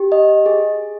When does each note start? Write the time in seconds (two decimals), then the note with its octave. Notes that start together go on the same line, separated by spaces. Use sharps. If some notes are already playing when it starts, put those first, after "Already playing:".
Already playing: G4
0.12 D#5
0.46 G#4